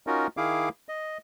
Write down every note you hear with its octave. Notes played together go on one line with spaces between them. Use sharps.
C#4 D#4 F4 F#4 A#4
D#3 E4 G#4 F5 D6
D#5